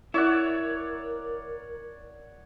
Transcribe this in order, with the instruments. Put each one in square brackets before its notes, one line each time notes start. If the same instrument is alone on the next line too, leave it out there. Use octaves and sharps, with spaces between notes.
[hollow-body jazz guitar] E4 [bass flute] A#4 [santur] C#5 D5 F#5